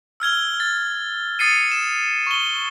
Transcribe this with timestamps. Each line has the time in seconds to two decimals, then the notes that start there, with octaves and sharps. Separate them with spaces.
0.20 E6 F6 G#6 G7
0.60 A6
1.39 D#6 A6 C7 C#7 D#7
1.71 E7
2.27 C#6 G7